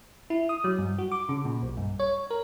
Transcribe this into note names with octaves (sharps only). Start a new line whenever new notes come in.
E4
D#6
F#3
G2
F#4
D6
C#3
A#2
B1
G2
C#5
A#4